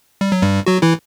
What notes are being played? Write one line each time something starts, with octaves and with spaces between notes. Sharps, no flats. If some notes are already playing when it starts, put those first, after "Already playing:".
G3
F#3
G2 G3
F#3 F#4
E3 E4